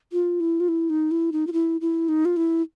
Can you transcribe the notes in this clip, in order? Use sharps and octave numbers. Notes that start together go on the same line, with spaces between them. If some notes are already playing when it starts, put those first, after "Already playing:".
F4
E4
F4
E4
D#4
E4
D#4
F4
E4
E4
D#4
F4
E4